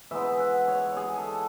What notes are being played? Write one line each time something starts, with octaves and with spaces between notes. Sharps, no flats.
E3 G#3 B3 D#4 E5
F#5
C#5
G#4
A4